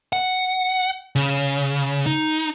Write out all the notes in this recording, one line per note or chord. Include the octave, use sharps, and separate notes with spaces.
F#5
C#3
D#4